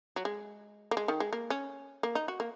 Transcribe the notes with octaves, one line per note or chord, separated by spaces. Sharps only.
F#3
G#3
A#3
G#3
D#3
G#3
A#3
C#4
A#3
D#4
F#4
A#3